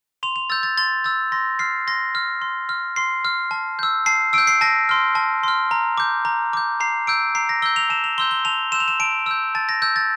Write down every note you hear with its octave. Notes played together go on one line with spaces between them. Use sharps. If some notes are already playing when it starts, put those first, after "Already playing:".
C6 F7
F7
E6 G6 A6
A6
C6 A6
E6 G6 A6
C6 A#6
F6 C7
C6 A#6
F6
C6
F6
C6 C7
F6
A5
E6 G6
A5 C7
E6 G6 D7
C7
A5 A#6
C6 F6
A5
C6 F6
A#5
D6 G6
A#5
D6 G6
A#5 C7
E6 G6 D7
A#5 C7
A#6
E6 G6 G7
F7
A5 E7
F7
C6 E6 G6 G7
G7
A5 F7
C6 E6 G6 E7
F7
E7
A5 D7
E6 G6
A5 A6
A#6
E6 G6
A6